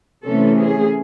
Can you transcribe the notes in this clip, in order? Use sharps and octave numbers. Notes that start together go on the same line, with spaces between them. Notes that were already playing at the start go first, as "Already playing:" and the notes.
C3 E3 A3 C#4 A4
G#4